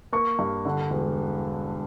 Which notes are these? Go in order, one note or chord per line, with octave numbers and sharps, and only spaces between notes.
A#3 C#6
G2
D3 F#5
E1